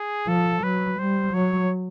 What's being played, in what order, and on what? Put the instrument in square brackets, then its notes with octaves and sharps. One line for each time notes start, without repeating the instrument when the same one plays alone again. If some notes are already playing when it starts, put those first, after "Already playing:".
Already playing: [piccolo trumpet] G#4
[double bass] F3 [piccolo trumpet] A4
[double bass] F#3 [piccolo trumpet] B4
[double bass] G3 [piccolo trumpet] C5
[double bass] F#3 [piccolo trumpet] C#5